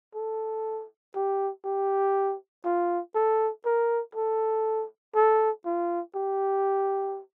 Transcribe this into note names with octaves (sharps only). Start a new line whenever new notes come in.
A4
G4
G4
F4
A4
A#4
A4
A4
F4
G4